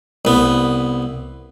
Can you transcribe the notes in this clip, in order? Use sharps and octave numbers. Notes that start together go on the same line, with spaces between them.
C2 B3